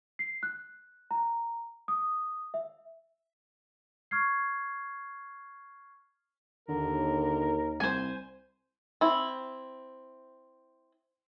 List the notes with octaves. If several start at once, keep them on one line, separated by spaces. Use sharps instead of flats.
C7
F#6
A#5
D#6
E5
C#6 F6 G#6 C7
D#2 D3 A#4
C2 C5 G#5
C4 E4